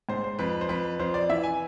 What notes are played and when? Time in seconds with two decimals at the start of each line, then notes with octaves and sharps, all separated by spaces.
0.09 G#2 C5
0.24 C5
0.39 F2 B4
0.61 C5
0.69 F2 B4
0.99 F2 C5
1.14 D5
1.30 E3 E5
1.43 G#5